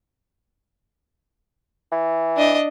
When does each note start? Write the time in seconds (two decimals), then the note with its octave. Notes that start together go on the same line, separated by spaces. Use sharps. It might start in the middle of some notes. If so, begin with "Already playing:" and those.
1.92 E3
2.37 D4 D#5